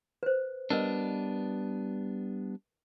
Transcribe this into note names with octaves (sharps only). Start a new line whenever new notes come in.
B4 C5
G3 B3 D4 A#4 B4 D#5